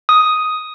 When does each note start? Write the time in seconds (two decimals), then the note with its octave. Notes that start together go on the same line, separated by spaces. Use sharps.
0.09 D#6